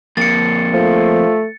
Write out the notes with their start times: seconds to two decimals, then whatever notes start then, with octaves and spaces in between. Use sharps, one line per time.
0.17 F2 A#3 A6 C#7
0.74 F3 A3